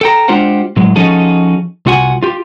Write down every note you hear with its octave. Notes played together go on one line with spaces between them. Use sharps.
A4 G5 A#5
G#3 D4 F4 G4 C5 F#5
A2 F#3 G#3
F3 C#4 D#4 F#4 G#4 A4
C2 F4 F#4 F#5 G#5
F4 G4